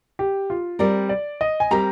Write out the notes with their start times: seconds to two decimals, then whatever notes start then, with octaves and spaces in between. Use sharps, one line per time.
0.19 G4
0.50 F4
0.79 G3 C4 G4 A#4 D5
1.09 D5
1.41 D#5
1.60 G#5
1.71 G3 C4 G4 A#4 A#5